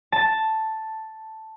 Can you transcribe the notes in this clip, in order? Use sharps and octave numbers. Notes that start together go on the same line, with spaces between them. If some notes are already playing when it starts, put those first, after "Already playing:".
A5